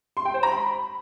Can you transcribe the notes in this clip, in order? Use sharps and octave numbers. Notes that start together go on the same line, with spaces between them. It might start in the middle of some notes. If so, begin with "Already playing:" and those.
C6
G5
C5
A#5
B5